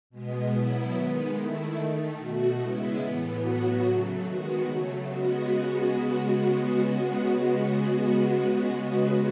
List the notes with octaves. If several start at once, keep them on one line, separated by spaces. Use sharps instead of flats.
B2 G#3 B3
B2 F#3 B3 E4
D#3 G#3 B3
D#3 A3 E4
D#3 A3
B2 A3 F#4
C#3 G#3 B3 E4
A2 E3 B3
A2 F#3 B3 F#4
C#3 F#3 A3
D#3 G#3 B3 F#4
C#3 F#3 A3
C#3 G#3 B3 F#4